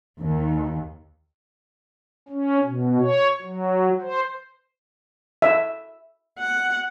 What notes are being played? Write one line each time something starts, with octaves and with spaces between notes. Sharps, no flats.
D#2
C#4
B2
C#5
F#3
C5
E5
F#5